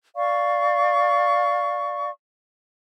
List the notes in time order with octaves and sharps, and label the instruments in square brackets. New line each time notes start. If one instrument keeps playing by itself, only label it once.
[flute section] D5 F5 C#6